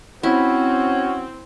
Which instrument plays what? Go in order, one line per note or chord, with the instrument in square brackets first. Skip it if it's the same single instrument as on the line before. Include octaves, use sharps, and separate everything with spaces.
[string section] C4 [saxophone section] C#4 F#4 [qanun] E4